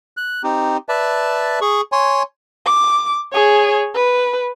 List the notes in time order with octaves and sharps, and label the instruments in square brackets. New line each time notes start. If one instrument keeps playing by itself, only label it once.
[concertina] F#6
C4 D#4 G4
B4 D5 E5 A5
G#4 C#6
C#5 G#5 C6
[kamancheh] D6
G#4 C#5
B4